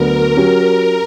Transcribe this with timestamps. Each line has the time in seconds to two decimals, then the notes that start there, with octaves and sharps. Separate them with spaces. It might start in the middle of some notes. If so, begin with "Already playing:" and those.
Already playing: D2 D3 F#3 B3 D4 A#4
0.36 F#3 C#4 G4
0.68 A#4